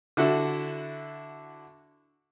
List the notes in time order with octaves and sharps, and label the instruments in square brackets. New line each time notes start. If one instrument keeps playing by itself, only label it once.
[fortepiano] D3 E4 F#4 A4